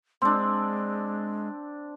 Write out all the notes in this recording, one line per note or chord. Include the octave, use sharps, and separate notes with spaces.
G#3 C4 D4 C6 E6